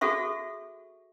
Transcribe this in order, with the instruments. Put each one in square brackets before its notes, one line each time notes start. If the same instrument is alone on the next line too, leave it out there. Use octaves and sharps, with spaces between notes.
[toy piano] F#4 G#4 A4 E5 C#6